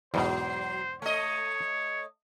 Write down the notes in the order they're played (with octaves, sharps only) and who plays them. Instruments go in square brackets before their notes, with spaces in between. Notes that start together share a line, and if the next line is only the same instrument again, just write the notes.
[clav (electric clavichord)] E2 G#2 B2 [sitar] F#3 [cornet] C5
[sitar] A3 D#5 [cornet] C#5